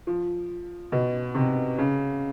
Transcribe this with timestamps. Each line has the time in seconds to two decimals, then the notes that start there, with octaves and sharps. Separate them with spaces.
0.07 F3
0.92 B2
1.35 C3
1.78 C#3